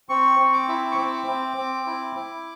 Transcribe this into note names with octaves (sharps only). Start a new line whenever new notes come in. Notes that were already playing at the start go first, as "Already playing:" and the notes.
C4 C#6
C4
D6
E4
C#6
C4 D6
C4
C4
E4
E4